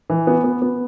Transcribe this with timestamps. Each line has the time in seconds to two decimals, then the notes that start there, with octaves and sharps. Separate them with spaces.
0.10 E3
0.27 B3
0.44 B3
0.62 B3